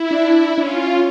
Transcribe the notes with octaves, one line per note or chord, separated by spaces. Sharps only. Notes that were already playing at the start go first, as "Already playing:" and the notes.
Already playing: E4
D4
D4
C#4 F4